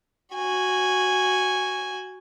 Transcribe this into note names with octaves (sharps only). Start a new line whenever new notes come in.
F#4 G#5